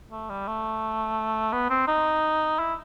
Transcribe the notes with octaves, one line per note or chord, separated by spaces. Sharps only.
A3
G3
A3
B3
C4
D#4
E4